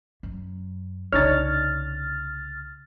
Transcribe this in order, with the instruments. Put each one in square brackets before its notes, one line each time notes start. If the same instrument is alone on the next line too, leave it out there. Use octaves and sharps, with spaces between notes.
[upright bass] F#2
[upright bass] C2 C#3 [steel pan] D4 D#4 C#5 [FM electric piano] F6 A6